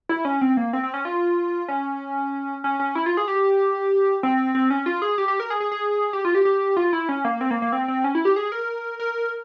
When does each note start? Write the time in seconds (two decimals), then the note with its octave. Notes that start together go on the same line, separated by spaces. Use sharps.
0.09 E4
0.25 C#4
0.41 C4
0.57 A#3
0.73 C4
0.83 C4
0.94 C#4
1.05 F4
1.68 C#4
2.64 C#4
2.80 C#4
2.95 E4
3.06 F4
3.17 G#4
3.28 G4
4.23 C4
4.55 C4
4.70 C#4
4.86 F4
5.02 G#4
5.18 G4
5.28 G4
5.40 A#4
5.50 G#4
5.60 G#4
5.72 G#4
6.13 G4
6.25 F4
6.35 G4
6.45 G4
6.77 F4
6.93 E4
7.09 C#4
7.25 A#3
7.41 C4
7.51 A#3
7.62 A#3
7.72 C4
7.88 C4
8.04 C#4
8.15 E4
8.25 G4
8.36 G#4
8.52 A#4
9.00 A#4